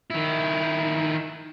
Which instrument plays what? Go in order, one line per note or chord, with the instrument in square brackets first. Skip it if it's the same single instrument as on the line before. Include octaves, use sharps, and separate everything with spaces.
[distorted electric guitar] D#3 E4